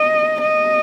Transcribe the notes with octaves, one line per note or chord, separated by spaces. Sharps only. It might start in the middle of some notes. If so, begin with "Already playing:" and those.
Already playing: D#5
D#5